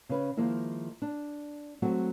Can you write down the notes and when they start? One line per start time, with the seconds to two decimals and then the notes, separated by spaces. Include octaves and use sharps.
0.09 C#3 C#4 B4
0.37 D#3 F3 G#3 A#3 E4
1.02 D4
1.82 F#3 G#3 A3 C4 F#4